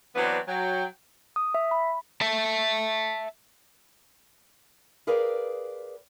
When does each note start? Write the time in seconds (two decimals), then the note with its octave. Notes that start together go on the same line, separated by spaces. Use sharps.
0.15 E3 F#3 B3 C4 D4
0.47 F#3 G5
1.36 D#6
1.54 E5
1.71 B5
2.21 E5 A5
5.07 G#4 A#4 B4 D5 F5 G5